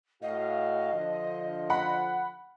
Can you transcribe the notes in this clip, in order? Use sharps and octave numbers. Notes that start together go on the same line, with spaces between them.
A2 F#4 D#5 F5
D3 F3
F#5 B5